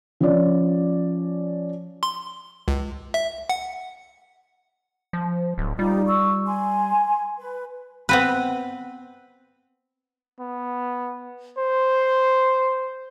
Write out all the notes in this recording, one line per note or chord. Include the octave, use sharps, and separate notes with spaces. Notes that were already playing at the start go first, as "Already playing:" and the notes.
F3 C#4 D5
C6
C#2
E5
F#5
F3
D1
G3 D#4 F4 G4
C#6 E6
G#5 C6
B4
B3 C4 B4
B3
C5